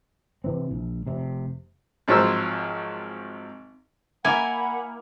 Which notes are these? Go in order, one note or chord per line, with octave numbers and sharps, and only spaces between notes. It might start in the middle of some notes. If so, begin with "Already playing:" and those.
C3 E3 C4
A#1
F1 C3
G#1 F3 F#3 C5 E6
A#3 E4 F#5 G#5 B5